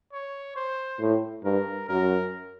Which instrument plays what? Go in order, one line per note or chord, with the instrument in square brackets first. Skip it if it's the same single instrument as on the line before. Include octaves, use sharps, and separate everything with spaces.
[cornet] C#5
C5
[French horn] A2
[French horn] G2 [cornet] A#4
[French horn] F#2 [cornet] A#4